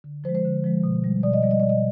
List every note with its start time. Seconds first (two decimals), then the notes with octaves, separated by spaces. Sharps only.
0.04 D3
0.24 F3 C5
0.29 G#3
0.35 C5
0.45 D3
0.64 F3 G#3
0.84 B2
1.04 G3
1.23 B2 D5
1.33 D#5
1.43 G3 D5
1.51 D#5
1.60 B2 D5
1.69 D#5